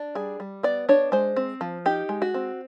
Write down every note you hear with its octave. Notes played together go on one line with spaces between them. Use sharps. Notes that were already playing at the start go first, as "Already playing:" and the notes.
Already playing: D4
G3 G#4
G3
B3 D5
D4 C#5
G#3 C5
C4
F3
D#4 G4
G#3
F#4
C4